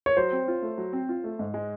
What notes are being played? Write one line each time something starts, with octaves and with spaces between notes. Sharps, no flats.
C#5
F#3 C5
C4
F4
A3
F#3
C4
F4
A3
G#2
G#3